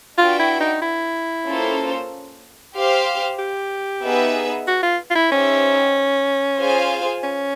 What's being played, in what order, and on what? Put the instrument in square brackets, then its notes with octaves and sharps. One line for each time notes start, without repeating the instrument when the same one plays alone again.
[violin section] D4 F#4 B4 E5 G5 [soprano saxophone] F4
[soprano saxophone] E4
D#4
E4
[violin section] A#3 C#4 F4 A4 C5
G4 C5 F5
[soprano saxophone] G4
[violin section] B3 D#4 G#4 B4 E5
[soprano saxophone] F#4
F4
F4
E4
[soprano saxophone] C#4 [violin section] D#4 G4 C5 E5
[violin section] F4 G#4 C5 F5 G#5
[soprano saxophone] C#4